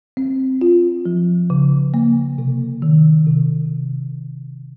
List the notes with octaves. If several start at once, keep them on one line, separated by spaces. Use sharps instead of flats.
C4
F4
F3
C#3
A#3
C3
D#3
C3